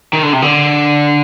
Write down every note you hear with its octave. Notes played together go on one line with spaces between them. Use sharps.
D#3
D3
C3
D3